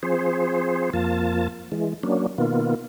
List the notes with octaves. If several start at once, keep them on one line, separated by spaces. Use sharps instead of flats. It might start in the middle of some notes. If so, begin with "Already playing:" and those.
F3 C4 G#4 C5
F2 F3 A#3 F4 A5
E3 G#3
F#3 A#3 C#4 D4
B2 D#3 A#3 B3 F4